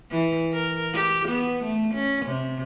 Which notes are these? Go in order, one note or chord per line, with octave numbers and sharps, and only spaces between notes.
E3
A#4
G4
B3
A3
C#4
C3